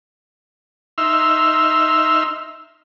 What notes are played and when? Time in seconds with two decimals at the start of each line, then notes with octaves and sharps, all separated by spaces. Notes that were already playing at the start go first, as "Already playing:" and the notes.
0.98 D#4 E5 C6 E6 F6